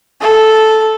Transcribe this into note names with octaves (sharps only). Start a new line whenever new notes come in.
A4